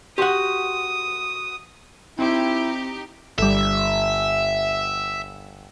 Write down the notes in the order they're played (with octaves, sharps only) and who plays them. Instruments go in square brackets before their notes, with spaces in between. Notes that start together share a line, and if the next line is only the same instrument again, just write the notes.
[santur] F#4 C6 [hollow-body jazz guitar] G4 F#5 [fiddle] D#6
[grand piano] C4 [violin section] D#4 G4 [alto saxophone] E4
[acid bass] G1 [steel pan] G3 A4 [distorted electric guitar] E5